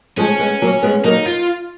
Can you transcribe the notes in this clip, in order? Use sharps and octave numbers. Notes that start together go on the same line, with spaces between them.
F3 G#3 C#4
G#3 B3
F#3 A#3
G#3 B3
F#3 A#3 D#4
F4